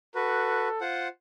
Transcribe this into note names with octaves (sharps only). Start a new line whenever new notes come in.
F#4 A4 B4
F4 C5 F#5